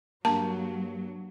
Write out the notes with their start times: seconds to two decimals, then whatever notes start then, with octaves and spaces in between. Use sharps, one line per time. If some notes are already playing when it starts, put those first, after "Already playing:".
0.25 G2 F#3 A#3 A5